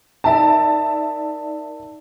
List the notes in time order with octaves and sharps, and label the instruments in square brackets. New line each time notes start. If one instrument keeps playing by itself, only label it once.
[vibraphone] D#4 A#4 D5 [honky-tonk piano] E5 A5